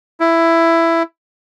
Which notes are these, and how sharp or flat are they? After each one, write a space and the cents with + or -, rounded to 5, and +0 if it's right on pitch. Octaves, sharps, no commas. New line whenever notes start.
E4 +10